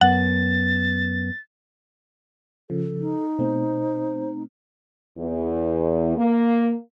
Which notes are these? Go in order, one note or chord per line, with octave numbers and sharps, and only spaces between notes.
F#2 B3 F#5 A6
C#3 F3 A4
D#4
B2 A3 C4 C5
E2
A#3